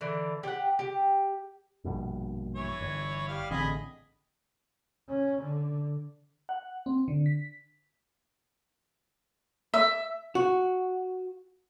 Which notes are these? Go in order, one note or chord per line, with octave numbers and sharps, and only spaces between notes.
D3 E3
G4 F#5
G4
A#1 G2 B2
E3 C#5
G1
G3 F5
A1 D3 C4 G#4 D#5 B5
C#4
D3
F#5
C4
D3
B6
E5
F#4